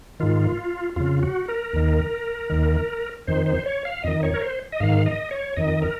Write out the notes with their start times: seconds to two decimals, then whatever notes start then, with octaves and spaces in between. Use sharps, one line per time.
0.20 G#2 D#3 F4
0.96 F2 C#3 F4
1.23 F#4
1.48 A#4
1.73 D#2 D#3
2.50 D#2 D#3
3.27 F2 D#3 C5
3.46 C5
3.66 C#5
3.85 F5
4.04 F2 D#3 D#5
4.23 C#5
4.34 A#4
4.42 C5
4.72 D#5
4.80 G#2 D#3 F5
5.06 D#5
5.31 C#5
5.57 F2 D#3 D#5
5.82 A#4